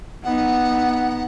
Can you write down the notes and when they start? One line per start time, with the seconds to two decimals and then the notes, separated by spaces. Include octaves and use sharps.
0.24 B3 D#4 F#5